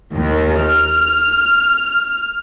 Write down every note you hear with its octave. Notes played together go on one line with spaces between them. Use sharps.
D#2 D#3
F6